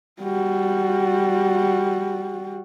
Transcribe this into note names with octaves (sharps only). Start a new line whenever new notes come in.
G3 F#4